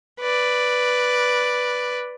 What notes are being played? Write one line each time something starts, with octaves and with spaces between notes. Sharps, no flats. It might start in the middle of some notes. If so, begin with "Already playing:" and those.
B4 D5